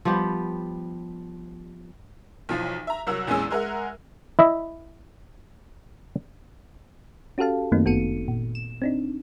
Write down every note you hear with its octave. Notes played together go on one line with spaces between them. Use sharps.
F3 G3 B3 G4
B1 E3 F3
E5 A#5
C2 F#3 F#4 A#4 E6
A#1 E2 G#3 C#4 G#4 E6
G#3 G#4 A#4 E5 F#5
E4 D#5 E5
C#4 F#4 G4 A4 F5 A5
F#2 D#3 A3 A#3 C4 D#4
G1 B3 F#4 A4 C#7 D#7
A#2
E7
C4 D4 D#4